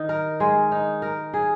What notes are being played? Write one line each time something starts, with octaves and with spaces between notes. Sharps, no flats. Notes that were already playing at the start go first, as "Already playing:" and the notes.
Already playing: D#3 D#4
A#4
G#3
D#4
A#4
G#4